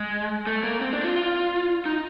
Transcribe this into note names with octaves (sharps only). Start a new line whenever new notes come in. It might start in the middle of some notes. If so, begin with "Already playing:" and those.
Already playing: G#3
A3
A#3
C4
D4
F4
F4
D#4